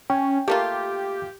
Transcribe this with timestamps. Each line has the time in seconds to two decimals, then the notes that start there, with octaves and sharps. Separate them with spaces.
0.10 C#4 G5
0.48 A3 A#3 F4 G4